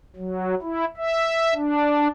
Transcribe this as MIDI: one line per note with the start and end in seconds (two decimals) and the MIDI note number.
0.16 0.55 54
0.62 0.85 64
0.97 1.54 76
1.54 2.08 62